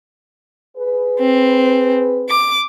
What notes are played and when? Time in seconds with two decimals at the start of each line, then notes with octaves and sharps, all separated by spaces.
0.77 G#4 B4
1.20 C4
2.29 D6